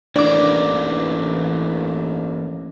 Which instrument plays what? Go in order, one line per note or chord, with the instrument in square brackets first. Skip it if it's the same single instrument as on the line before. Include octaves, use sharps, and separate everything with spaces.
[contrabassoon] A1 [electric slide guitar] E3 A#3 D#4 [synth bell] D4 D6 [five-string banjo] D5